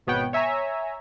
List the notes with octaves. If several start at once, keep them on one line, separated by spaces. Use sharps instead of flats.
G#1 B2 B3 C#5 F#5 G5
C#5 E5 G#5 A#5